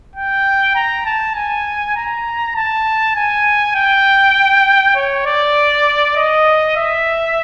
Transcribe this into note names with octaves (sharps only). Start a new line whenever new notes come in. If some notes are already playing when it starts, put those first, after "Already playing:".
G5
A#5
A5
G#5
A#5
A5
G#5
G5
C#5
D5
D#5
E5